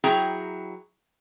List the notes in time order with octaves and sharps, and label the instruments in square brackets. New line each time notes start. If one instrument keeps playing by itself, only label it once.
[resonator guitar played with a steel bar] F#3 E4 G#4 G5 A#5